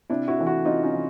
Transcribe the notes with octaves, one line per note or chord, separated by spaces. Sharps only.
C3 D4 E4
E4 F#4
E3 A3
E4 F#4
C3 D#4 F4
C#4 D#4
E3